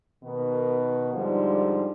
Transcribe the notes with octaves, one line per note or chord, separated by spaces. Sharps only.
B2 D#3 B3
G#2 D3 F3 G3